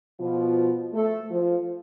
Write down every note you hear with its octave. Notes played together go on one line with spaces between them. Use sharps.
B2 F3 F4
A3 A4
F3 F4